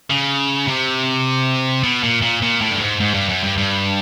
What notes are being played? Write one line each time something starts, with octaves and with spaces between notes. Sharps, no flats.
C#3
C3
B2
A#2
A#2
A#2
A2
G2
G#2
G#2
G2
F#2
G2
G2